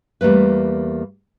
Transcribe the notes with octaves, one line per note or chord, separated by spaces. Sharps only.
E2 G3 A3 A#3 B4